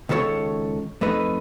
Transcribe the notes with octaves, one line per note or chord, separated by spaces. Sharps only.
C#2 D#3 A4 A#4 C#5
F2 A3 D#4 B4